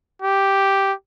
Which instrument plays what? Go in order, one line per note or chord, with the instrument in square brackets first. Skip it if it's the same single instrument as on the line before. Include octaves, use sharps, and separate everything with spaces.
[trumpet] G4